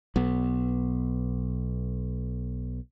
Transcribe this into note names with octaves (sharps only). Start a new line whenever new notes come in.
B1 B3